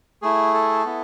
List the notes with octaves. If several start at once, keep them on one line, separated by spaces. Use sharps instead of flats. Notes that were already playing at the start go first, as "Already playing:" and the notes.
A3 E4 G#4
A4
B3 E4